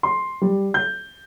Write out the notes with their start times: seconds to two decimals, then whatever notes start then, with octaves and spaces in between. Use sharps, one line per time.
0.03 C6
0.42 G3
0.74 G6